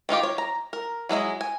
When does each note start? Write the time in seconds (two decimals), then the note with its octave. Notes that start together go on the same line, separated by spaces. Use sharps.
0.09 D#3 D#4 F4 G4
0.23 C#5
0.38 A#5
0.73 A#4
1.09 F#3 G#3 E4 D#5
1.41 G#5